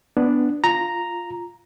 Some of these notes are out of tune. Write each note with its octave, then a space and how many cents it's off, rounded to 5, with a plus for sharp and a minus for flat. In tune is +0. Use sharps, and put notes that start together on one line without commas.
B3 +0 D4 +0
F4 +0 A#5 +0